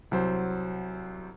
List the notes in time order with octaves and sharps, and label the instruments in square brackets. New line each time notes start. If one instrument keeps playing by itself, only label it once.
[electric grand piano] C2 F#3 C5